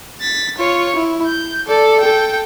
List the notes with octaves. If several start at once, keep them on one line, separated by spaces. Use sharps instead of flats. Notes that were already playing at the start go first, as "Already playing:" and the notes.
A6 B6
F4 C#5
E4
G6
A4 D5
A4 G5